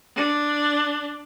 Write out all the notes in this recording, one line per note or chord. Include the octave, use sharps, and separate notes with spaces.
D4